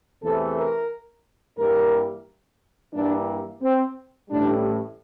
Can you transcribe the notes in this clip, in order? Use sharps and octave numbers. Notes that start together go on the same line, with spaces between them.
E2 C3 E3 A3 A4
A#4
G2 E3 G3 A#3 A#4
G2 E3 G3 A#3 D4
C4
A1 A2 G3 D4